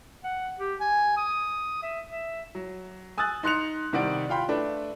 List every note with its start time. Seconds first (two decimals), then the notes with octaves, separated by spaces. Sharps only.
0.24 F#5
0.59 G4
0.80 G#5
1.17 D#6
1.82 E5
2.09 E5
2.55 F#3
3.18 G#5 D#6 E6 F#6 A6
3.43 D#4 C6 F#6 C#7 F7
3.93 C3 D#3 G3 D5 F#5 D7
4.29 F4 F5 G5 B5 C6
4.48 A3 D4 B4